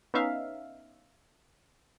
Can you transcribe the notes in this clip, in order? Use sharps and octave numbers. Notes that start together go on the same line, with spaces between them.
B3 C#4 D#4 E5 F5